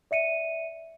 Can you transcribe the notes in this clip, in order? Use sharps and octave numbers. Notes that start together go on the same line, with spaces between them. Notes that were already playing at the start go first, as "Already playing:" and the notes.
D5 E5 C#7 D#7